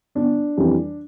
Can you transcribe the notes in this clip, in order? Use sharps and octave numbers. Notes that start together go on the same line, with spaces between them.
G1 D4
F2 E3 G3